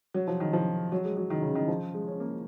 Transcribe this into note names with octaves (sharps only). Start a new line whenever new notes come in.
F#3
F3
D#3
F3
F#3
G#3
F#3
D#3
C#3
D#3
F3
G#3
C#4
A#3